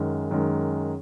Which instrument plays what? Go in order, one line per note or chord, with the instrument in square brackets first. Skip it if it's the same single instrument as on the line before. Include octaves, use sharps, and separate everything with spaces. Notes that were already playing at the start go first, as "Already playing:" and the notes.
Already playing: [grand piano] F#2 D#3 G#3
F#2 D#3 G#3